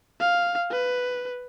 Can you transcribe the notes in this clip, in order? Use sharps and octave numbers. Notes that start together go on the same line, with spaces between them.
F5
B4